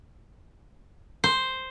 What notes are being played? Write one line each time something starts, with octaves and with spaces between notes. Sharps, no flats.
C5